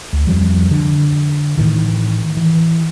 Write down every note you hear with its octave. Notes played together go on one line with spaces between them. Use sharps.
D2
F2 F3 G3
D3
A2 D#3 E3
E3